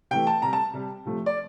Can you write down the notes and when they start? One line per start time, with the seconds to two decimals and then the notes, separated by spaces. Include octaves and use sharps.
0.11 C3 E3 A3 G5
0.27 A5
0.42 C3 G3 A#5
0.53 A5
0.73 C3 G3
1.05 C3 F3 A3
1.26 D5